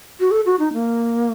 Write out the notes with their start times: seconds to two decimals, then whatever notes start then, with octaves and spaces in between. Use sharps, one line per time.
0.20 F#4
0.31 A4
0.46 F#4
0.59 D#4
0.73 A#3